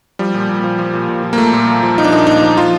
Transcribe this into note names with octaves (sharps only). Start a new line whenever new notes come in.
F3 G3
A#2
A#2
F3
F3
A#2
A#2
F3
A#3
F3 A3
A#2
A#2
F3
F3 D#4
D4
A#2 D#4
A#2 D#4
F3
F3 F4